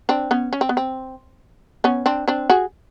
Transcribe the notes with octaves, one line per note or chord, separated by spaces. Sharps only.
C4 D4
B3 C#4
C#4
C4
B3
C4
B3 C#4
C4 D4
C4 D4
F#4 G#4